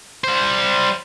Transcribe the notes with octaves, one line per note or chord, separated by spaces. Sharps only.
G3 C5